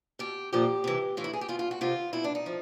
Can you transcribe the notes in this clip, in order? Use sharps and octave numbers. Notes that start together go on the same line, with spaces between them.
B2 G4
A#2 F3 G4
C3 E3
A2 E3 F4
E4
G#4
G4
B2 F4
F4
F#4
C3 D#3 F4
B2 E4
D4
D#4
F3